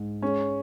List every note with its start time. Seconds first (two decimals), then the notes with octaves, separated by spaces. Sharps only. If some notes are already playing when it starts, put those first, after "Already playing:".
Already playing: G#2
0.22 G#3 C#4